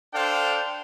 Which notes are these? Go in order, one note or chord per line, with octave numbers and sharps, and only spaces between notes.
D4 A4 C5 F5 G5